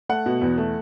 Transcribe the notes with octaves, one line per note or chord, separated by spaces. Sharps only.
A3 F#5
B2
E2
A3